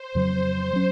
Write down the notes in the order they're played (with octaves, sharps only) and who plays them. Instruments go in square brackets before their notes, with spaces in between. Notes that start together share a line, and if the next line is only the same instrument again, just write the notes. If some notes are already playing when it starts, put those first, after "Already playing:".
Already playing: [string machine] C5
[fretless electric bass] F2 C#3 F#3
F#3 C#4